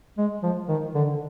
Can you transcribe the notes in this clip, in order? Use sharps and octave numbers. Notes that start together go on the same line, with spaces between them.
G#3
F3
D#3
D3